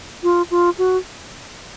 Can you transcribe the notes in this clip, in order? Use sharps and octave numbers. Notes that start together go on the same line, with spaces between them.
F4
F4
F#4